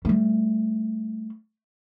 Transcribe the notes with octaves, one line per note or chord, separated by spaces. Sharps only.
G3 A3